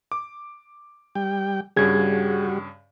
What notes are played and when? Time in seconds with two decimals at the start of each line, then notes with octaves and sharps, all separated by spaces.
0.12 D6
1.15 G3 G5
1.77 G2 C#3 G3 F#4 G#4 G#6